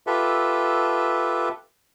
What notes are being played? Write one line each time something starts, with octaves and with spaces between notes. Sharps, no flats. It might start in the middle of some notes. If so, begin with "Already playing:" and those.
F4 G4 A4 B4 E5